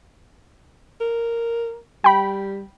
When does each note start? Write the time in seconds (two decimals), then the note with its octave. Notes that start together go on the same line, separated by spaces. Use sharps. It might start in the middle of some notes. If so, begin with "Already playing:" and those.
1.01 A#4
2.04 G3 G5 B5